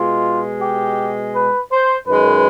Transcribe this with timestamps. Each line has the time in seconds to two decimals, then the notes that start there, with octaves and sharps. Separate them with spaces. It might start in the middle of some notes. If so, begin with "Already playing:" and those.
Already playing: B2 G#3 F4
0.62 G4
1.34 B4
1.71 C5
2.07 F#2 D#3 G#3 B4